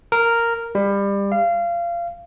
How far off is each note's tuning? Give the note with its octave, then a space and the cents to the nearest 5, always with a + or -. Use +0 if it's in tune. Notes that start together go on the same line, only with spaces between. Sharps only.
A#4 -5
G3 +25
F5 -25